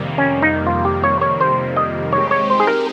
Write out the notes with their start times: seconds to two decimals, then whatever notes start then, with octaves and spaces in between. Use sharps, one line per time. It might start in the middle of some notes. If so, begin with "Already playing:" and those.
Already playing: F2 C3 D#3 G3 A#3
0.18 C#4
0.42 D#4
0.67 F4
0.85 G4
1.04 C#5
1.21 C#5
1.41 C5
1.76 D#5
2.12 G#3 C4 D#4 G4 C#5
2.31 C#5
2.50 C5
2.60 G#4
2.67 A#4